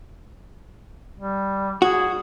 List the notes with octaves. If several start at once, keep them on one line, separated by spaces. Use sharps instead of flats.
G3
F#4 G#4